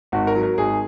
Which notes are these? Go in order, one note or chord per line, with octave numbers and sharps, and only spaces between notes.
G#1 F#4
A#4
F#3
A#4
G#1 G#4